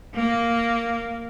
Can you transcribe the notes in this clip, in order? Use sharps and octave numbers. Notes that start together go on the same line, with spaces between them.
A#3